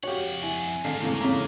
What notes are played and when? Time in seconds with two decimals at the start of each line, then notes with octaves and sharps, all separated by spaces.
0.03 F2 F#4 G4 C#5 F5 F#5
0.43 E4 G#5
0.85 G#2 D3 F5 C7
1.02 E2 A2 C3 A#3
1.21 C#3 A#5